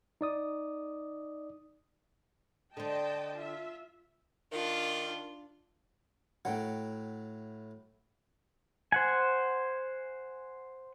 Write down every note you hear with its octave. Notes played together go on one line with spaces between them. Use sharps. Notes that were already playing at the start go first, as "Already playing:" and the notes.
D#4 D5 D#6
D3 C5 D#5 G5 A5
F4 E5
D#3 D4 F4
A2 F#3 F#5 G5
C5 F#5 G#5